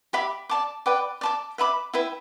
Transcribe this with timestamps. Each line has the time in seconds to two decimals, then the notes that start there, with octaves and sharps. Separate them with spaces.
0.13 G4 E5 B5 D6
0.49 D5 A5 D6
0.86 B4 D5 G5 D6
1.21 D5 A5 D6
1.58 B4 E5 B5 D6
1.94 E4 B4 E5 G5